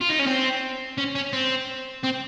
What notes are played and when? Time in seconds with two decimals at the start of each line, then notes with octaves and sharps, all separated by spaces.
0.01 F4
0.09 D#4
0.19 C#4
0.27 C4
0.98 C#4
1.15 C#4
1.33 C4
2.03 C4